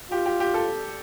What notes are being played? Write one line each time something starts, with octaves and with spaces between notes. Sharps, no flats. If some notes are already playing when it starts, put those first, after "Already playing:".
F4 G4
G4
G4
A4